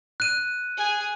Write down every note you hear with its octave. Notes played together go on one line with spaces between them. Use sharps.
F#6 D#7
G#4 G#5